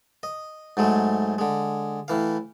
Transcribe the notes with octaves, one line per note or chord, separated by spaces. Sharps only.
D#5
G#2 F#3 G#3 A3
D3 G#3
A2 E3 F5